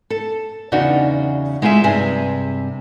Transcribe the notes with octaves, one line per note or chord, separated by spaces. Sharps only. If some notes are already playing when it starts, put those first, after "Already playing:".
A4
E2 C#3 D4 D#4 F#4
G#3 D#4 F4 G#4 E5
G2 C3 G#4 G#5